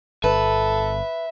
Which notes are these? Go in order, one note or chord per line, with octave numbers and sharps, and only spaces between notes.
G1 A4 B4 E5